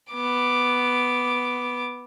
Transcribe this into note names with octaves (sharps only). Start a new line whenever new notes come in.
B3 D6